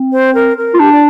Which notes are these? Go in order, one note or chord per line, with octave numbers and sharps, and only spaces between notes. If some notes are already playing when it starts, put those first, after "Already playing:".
Already playing: C4
C5
A#4
A#4
F4
D4 G4
D5